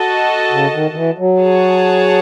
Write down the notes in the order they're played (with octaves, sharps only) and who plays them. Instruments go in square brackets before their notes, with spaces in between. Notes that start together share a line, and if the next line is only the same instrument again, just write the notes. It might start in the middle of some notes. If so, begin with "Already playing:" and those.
Already playing: [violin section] F#4 A4 D#5 A5
[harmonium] C#3
D#3
D#3
E3
F#3
[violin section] G#4 C#5 F#5 A5